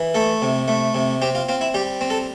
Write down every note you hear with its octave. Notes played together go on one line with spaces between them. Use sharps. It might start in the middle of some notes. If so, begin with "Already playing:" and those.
Already playing: E3
A3 A4
C3
A3
C3
C4 G4
F4
C4 F4
E4
G3 G4
C4
A4